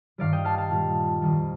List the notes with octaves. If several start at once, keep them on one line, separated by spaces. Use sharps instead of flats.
G2 D#3 G3 D5 F5
D#5 G5
F5 A5
F5 A5
A#2 G3
F2 D#3 G3